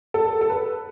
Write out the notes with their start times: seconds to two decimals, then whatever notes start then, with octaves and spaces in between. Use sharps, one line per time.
0.14 A4
0.41 A4
0.50 B4